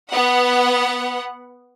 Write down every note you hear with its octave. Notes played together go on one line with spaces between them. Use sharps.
B3 F#5